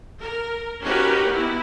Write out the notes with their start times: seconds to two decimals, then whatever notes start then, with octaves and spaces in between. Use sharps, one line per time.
0.21 A#4
0.82 C#4 D#4 F#4 G4 A#4 B4
1.28 B3 E4